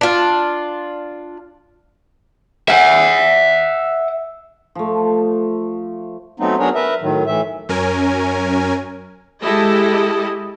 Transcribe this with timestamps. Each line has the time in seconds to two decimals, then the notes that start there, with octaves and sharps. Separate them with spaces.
0.01 D4 F4
2.68 E5 F#5
4.75 F3 A3
6.40 F#3 A3 B3 C4 D#4
6.59 F#3 B3 D4 G#4 A#4 C#5
6.75 A#4 B4 E5
7.02 A2 D#3 F#3
7.26 A2 E3 E5
7.69 F#2 C#4 A#4 G#5
9.42 G#3 E4 G4 A4 D#5